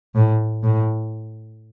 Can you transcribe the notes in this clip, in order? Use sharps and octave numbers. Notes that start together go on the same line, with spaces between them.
A2
A2